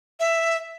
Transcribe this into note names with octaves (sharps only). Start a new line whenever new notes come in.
E5